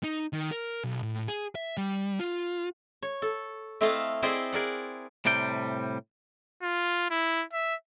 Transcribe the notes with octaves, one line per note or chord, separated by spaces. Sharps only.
D#4
D#3
A#4
B1
A2
G#4
E5
G3
F4
C#5
A4
A3 C4 E4 D#5 F5 A5
C4 E4 G#4 C5 D5 D#5
G#4 A#4 D5 F#5
A2 C3 G3 G5
F4
E4
E5